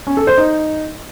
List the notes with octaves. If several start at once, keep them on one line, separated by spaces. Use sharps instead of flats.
C#4
A4
C5
D#4